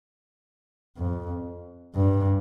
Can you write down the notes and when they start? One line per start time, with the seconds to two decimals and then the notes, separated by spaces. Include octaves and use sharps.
0.97 F2
1.95 G2